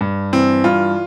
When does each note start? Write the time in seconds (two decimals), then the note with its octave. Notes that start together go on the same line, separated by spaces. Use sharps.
0.01 G2
0.33 E3 C4
0.64 G2 F4